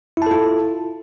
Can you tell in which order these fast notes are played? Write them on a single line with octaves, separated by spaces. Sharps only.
E4 A5 A4 F4